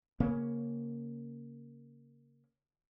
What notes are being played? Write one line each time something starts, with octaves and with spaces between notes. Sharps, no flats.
C#3 A#3 C#4